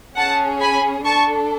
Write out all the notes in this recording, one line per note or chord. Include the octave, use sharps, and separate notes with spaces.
C#4 G#4 F#5 A5
G#5 B5
D4 A4 A5 C#6